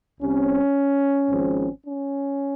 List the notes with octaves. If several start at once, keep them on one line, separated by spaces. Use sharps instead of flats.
C2 C3 G3 C4 C#4
G#1 G#2 F3 C4
C#4